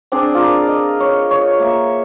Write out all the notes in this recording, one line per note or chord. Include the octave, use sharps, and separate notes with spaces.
C4 D4 G#4 D5
F4 A#4
D#5
C#5
C#5
A#3 E5